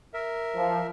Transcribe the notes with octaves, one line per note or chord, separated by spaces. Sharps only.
A#4 E5
F3